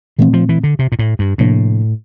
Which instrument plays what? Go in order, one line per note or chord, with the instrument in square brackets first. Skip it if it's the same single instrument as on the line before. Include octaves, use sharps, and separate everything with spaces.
[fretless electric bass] A#2 A3 C4 [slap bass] E3
[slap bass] F3
E3
D3
C3
A#2
A2
G2
[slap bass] A2 [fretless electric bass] C3 F3 A#3 D4